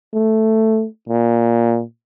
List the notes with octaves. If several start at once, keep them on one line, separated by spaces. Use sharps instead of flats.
A3
A#2